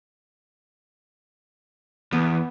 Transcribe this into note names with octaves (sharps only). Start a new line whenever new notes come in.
E2 B3